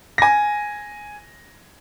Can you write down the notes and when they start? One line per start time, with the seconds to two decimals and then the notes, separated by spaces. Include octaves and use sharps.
0.18 G#5 A#6